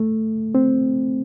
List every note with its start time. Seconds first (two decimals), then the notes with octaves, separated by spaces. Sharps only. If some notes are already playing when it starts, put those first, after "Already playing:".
Already playing: A3
0.55 C4